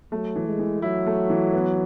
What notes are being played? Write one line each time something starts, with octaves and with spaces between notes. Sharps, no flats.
F#3 A3
E3
G#3
E3
F#3 E4
A3
E3
B3